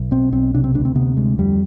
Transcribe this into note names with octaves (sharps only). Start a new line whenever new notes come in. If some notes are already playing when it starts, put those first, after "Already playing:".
Already playing: B1
B2 C4
B1 C4
C3 D4
C4
D2 D4
C4
C3 B3
D2 G#3
F2 G3